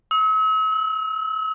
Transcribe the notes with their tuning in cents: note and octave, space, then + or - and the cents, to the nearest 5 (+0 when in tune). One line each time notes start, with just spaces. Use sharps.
E6 -45
E6 +0